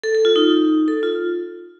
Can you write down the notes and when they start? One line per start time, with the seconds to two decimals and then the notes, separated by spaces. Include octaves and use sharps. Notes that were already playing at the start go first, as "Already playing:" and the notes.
0.04 A4
0.15 A4
0.25 F4
0.36 D#4
0.88 A4
1.03 F4